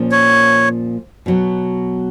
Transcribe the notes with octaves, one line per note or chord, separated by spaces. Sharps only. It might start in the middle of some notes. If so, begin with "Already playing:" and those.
Already playing: A#2 F3 A#3 C#4
C#5
B2 F#3 B3